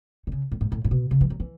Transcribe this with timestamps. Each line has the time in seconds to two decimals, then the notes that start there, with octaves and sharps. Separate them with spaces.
0.27 D3
0.32 C#3
0.52 A2
0.61 G#2
0.72 A2
0.84 A2
0.91 B2
1.11 C#3
1.21 E3
1.30 F#3
1.40 E3